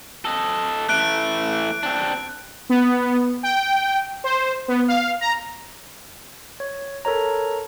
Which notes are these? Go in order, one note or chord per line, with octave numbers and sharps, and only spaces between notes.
A4 D#5
E3 A3 F#6 D7
C4 D4
B3
G5
C5
B3
F5
A#5
C#5
A4 A#4 C#5 A#5